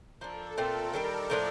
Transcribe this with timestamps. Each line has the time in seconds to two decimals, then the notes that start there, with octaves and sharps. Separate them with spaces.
0.21 F3 A#3 D4 A4
0.57 A#2 A3 C4 F4 A#4
0.93 D#3 G3 D4
1.30 A2 F3 A#3 D4